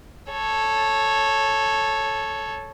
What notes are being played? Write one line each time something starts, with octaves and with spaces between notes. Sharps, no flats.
A4 C#5